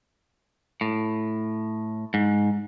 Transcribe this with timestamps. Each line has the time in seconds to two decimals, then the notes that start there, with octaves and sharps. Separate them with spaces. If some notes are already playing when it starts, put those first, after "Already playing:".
0.81 A2
2.14 G#2